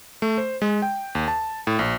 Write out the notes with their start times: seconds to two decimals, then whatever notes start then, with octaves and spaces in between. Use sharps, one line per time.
0.22 A3
0.38 C5
0.62 G#3
0.82 G5
1.15 D#2
1.28 A5
1.67 A2
1.79 A#1